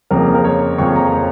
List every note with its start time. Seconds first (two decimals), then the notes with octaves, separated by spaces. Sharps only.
0.11 F2 C#3 F3 A#3 A#4
0.35 A#4
0.45 C#5
0.78 F2 C#3 F3 A#3 C#6
0.96 A#5
1.13 C#5